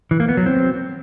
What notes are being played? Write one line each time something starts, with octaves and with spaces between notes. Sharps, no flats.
E3
A#3
B3
F#3
C4